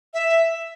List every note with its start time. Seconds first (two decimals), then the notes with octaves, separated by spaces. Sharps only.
0.14 E5